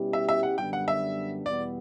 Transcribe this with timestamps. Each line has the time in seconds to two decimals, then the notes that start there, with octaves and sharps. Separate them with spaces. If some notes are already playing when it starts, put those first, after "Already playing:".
Already playing: B2 G3 C#4 E4 G4
0.13 E5
0.29 E5
0.43 F#5
0.58 F#2 D3 G3 B3 D4 G5
0.73 F#5
0.88 E5
1.46 E2 B2 G3 B3 D5